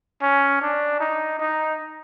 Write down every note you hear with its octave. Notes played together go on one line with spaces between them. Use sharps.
C#4
D4
D#4
D#4